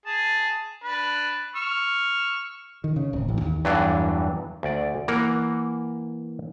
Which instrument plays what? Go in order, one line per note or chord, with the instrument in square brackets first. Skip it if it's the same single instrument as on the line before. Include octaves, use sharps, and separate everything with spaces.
[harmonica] G#4 A5
D4 B4
C#6 E6 F6
[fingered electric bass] D#3
C#3
D1
A1
D#2
[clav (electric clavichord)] E2 G2 E3 F#3 D4
D2 D5
E3 A#3 A#4 F#5 A#5